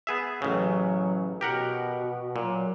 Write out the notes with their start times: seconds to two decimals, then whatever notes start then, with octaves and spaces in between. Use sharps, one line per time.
0.07 B3 G#4 E5
0.42 A1 C#3 F#3
1.41 B2 G4 A#4 F#5
2.36 A#2 F#3